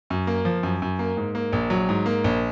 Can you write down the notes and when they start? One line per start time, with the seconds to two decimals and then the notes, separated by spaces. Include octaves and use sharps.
0.10 F#2
0.27 A#3
0.45 F3
0.63 F#2
0.82 F#2
0.99 A#3
1.17 G#2
1.35 A#3
1.53 A#1
1.70 F#3
1.89 G#2
2.06 A#3
2.24 A#1